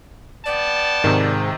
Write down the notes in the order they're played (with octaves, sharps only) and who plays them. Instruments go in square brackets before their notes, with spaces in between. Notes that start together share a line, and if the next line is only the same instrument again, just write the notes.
[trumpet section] B3 G5 A5 [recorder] D5
[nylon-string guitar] G#2 [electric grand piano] C3 D#3